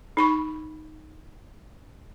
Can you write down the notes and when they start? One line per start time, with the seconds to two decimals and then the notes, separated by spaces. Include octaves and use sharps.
0.17 D#4 B5 C#6